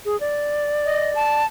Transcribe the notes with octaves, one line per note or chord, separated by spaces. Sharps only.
G#4
D5
D#5
A5